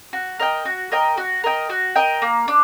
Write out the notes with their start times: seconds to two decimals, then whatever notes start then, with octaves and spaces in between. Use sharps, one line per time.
0.13 F#4
0.39 A#4 D#5 G5
0.65 F#4
0.92 A#4 D#5 G5
1.17 F#4
1.44 A#4 D#5 G5
1.70 F#4
1.96 A#4 D#5 G5
2.22 A#3
2.48 D4